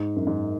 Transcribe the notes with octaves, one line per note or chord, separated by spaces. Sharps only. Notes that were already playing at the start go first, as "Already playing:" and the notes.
Already playing: G#2
F#2
G#2